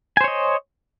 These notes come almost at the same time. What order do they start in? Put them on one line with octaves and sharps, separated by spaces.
G#5 C5 C#5 D#5